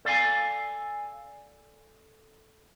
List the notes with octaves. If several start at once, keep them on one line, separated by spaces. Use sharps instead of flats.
A4 D5 F5 G#5